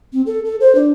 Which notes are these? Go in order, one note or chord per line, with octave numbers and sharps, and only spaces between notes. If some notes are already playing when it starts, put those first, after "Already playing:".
C4
A4
A4
C5
D4